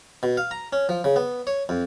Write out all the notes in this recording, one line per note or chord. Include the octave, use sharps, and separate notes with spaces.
B2
F5
A#5
C#4
F3
C#3
B3
C#5
F2